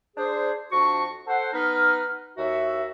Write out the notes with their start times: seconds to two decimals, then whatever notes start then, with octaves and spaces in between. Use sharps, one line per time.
0.17 D4 G#4 C5
0.72 F2 F3 D4 F#4 C#6
1.27 A4 C5 F#5
1.53 B3 D#4 B4 F6
2.38 D#2 F#4 E5